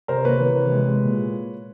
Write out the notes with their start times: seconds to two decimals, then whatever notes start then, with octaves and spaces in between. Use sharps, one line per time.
0.08 C3 A#4 C5
0.24 A#3 B4 C#5
0.40 E3
0.56 C3
0.72 G#3
0.87 G#3
1.04 A#2